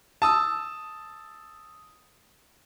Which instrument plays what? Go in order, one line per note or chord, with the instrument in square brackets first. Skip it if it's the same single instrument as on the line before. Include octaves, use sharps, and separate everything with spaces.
[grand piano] A5 D#6 E6